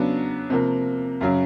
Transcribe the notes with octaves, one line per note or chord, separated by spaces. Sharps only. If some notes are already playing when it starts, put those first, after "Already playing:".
Already playing: C#3 F#3 B3 D4
C3 F3 A#3
F#2 C#3 F#3